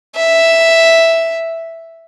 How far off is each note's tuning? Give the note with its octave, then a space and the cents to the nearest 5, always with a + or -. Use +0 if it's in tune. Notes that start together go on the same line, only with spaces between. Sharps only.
E5 +0